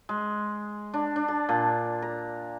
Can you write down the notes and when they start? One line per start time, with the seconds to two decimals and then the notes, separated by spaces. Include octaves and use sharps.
0.09 G#3
0.94 D4
1.16 D4
1.28 A5
1.49 A#2
2.02 A#5